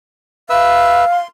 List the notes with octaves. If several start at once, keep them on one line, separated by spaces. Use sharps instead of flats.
B4 E5 F5 E6
C6